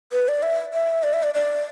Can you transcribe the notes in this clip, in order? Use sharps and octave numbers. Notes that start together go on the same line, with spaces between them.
B4
D5
E5
E5
D5
E5
D5
D5